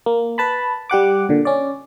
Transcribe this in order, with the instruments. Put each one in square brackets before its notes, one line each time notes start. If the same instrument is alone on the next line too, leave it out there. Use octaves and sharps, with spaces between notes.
[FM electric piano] A#3
B4 A5 B5
G3 G4 F#5 D6
A#2 D3
C#4 D5